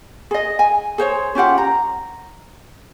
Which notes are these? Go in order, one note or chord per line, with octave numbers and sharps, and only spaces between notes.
G#4 D#5
G#5
G#4 C5 C#5
C#4 F4 G4 F#5
A#5